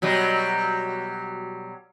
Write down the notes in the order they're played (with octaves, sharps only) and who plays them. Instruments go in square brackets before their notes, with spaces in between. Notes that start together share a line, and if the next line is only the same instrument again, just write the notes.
[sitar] B2 F#3 G3